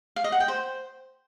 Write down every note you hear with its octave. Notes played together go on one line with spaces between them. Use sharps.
F5
D#5
F#5
G5
C5